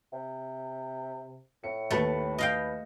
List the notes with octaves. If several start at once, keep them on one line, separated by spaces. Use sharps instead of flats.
C3
A2 C#7
D#2 A3 B4 C#7
D#5 F5 G5